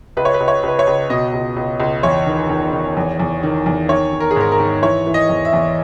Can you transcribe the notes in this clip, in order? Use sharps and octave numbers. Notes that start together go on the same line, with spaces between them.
C#2 B4
C#5
B4
C#2
C#5
C#2 B4
C#5
C#2
B2 D#5
C#2
C#2
C#2
E2 C#5
D#3
D#3
D#3
E2
E2
D#3
E2
D#3 C#5
D#3
A#4
G#4
G#2 A#4
A#4
D#3
E3 C#5
E3
D#5
E2
E5
E2